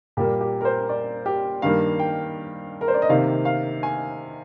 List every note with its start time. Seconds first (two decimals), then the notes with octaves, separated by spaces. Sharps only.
0.17 A#2 G3 A#3 G4
0.41 G4
0.61 A#4
0.65 C5
0.89 D5
1.26 G4
1.62 G2 D#3 G3 A#3 F5
2.00 G5
2.81 A#4
2.88 C5
2.94 D5
3.02 D#5
3.09 C3 D#3 A#3 F5
3.45 F5
3.83 G#5